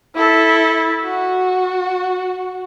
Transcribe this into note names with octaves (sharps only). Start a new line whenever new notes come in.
E4 A4
F#4